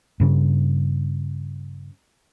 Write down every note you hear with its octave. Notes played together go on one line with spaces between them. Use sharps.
G2 C#3